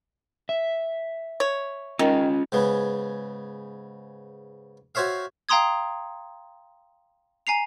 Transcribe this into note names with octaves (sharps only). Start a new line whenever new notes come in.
E5
C#5
D#3 C#4 F4 D#5
G#2 C#3 B3
F#4 C5 C#5 E5 F5
F5 G5 A#5 C6 D#6 G#6
G#5 A#5 C7 F7